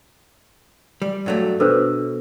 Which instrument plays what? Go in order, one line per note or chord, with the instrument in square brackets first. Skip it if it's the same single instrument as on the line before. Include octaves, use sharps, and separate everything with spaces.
[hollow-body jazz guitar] G3
G2 F#3 A3
[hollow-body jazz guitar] B2 [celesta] D4 E6 [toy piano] A4 B4 C5